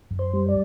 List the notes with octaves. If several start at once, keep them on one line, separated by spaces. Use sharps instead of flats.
F#2
C5
G3
D5